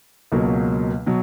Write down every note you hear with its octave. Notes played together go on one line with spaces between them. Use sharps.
C#2 B2 F#3 A#3
B2 F#3